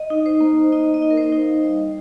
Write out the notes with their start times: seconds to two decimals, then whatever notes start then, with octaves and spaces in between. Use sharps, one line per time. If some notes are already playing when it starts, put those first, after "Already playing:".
Already playing: D#5
0.10 D#4
0.26 C5
0.41 A#3
0.72 D#4 D#5
0.94 D#5
1.02 D#4
1.10 A#4
1.17 C5
1.32 D#4
1.41 F5
1.64 G3 D#5